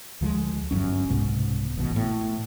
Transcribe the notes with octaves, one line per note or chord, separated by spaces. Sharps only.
D2 F3 F#3 G#3
G1 F#2 C#4
C2 G#2 B2
A1 B2
A2